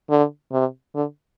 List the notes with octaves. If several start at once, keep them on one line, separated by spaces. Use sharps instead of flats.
D3
C3
D3